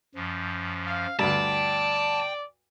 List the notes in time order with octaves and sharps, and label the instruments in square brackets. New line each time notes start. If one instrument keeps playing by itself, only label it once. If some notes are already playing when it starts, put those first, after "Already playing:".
[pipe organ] F#2 F3
[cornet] F5
[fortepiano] D2 G2 [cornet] D5 [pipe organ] G5 [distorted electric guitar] A5